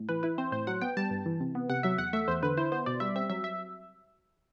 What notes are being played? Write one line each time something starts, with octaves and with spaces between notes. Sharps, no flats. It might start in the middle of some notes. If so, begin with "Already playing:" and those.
Already playing: A2
E3 B4
E4 B4
C4 C5
A2 C5
F#3 F#5
B3 G5
G3 A5
G2
E3
C3
B3
C3 F#5
F#3 E5
E2 F#5
A3 E5
E2 C5
D3 B4
E4 C5
B3 C5
B2 D5
G3 E5
C4 E5
F#3 E5
E5